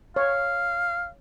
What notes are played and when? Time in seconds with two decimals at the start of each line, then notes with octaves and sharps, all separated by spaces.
0.16 C#5 F5